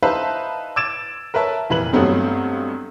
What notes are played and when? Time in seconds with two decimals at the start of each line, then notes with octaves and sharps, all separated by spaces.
0.02 D#4 B4 C5 E5 F5 A5
0.76 D6 E6 G#6 A6 D7 E7
1.34 A#4 B4 C#5 E5 A5
1.70 F1 A#2 E3 A#3 B4 F#7
1.93 G2 F#3 A3 B3 C4 D#4